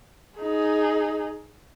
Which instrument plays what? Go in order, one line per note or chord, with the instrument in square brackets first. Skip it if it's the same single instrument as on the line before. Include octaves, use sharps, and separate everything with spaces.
[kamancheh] D#4 G#4